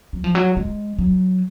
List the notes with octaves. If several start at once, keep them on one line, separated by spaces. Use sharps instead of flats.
F#3
F3
F#3
G#3
F#3